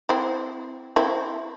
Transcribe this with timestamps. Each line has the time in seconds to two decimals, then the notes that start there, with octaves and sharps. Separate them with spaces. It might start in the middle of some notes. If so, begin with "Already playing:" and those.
0.09 C4 E4
0.96 C4 E4